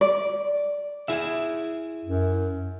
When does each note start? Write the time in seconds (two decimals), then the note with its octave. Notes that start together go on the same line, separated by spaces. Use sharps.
0.01 D5
1.08 E4 G#4 E5
2.05 F#2